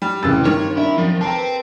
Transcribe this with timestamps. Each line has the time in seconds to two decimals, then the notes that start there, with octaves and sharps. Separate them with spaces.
0.02 G3
0.23 F1 C#3 E3 A#3 C4 E6 A6
0.45 G2 D#3 C#5 C6
0.77 D4 E4
0.98 F#2 F3
1.21 G4 A4 B4 C5 G5 A5 A#5